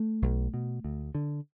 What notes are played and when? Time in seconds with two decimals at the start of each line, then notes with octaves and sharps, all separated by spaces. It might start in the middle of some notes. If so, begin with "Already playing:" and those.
Already playing: A3
0.22 B1
0.54 B2
0.84 D2
1.15 D3